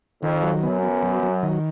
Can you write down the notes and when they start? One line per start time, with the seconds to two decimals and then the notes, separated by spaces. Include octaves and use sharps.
0.22 F2 D#3
0.43 F#3
0.63 F#2 B3
0.83 B3
1.03 F#3
1.23 F#3
1.43 D#3